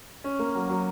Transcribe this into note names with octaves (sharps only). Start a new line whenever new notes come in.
C#4
A#3
F#3
F#3